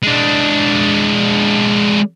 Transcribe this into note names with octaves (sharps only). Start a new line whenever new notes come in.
G#3 D4